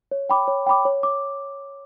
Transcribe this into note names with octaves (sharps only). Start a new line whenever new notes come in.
C#5
G5 B5 D6
C#5
G5 B5 D6
C#5
D6